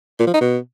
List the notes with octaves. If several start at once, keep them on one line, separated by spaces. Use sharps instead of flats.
A#2
F3
D#4
B2